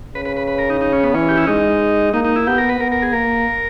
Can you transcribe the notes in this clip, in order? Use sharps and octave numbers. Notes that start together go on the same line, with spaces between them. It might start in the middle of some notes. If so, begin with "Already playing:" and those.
C#3 B4
B4
B4
B4
A#4
D#4
D#4
C#4
B3
E3 C#4
G4
E4
G#3 D#4
A#3 D#4
D#4
E4
B3 G4
A#4
B4
B3 A#4
A#4
G#4
A#3 A#4